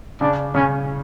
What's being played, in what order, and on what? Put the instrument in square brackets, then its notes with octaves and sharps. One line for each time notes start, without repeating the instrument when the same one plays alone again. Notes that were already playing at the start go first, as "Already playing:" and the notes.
[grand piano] C#3 [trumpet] D4
[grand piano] C#3 [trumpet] C#4